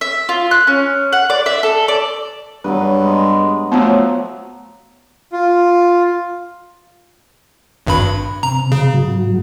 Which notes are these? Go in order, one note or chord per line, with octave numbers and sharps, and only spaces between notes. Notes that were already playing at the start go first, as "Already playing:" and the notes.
E5
F4
F#6
C#4
F#5
D5
E5
A4
D5
G2 F#3 B3 B4
G#3
F3 F#3 A3 B3
F4
G#1 G2 B5
C3 A#5
C#3
G#2 F#3